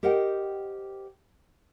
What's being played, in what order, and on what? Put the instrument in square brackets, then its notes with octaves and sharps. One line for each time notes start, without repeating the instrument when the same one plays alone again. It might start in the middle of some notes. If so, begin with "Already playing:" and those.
[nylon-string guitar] G4 A#4 C5 D#5 F#5 G5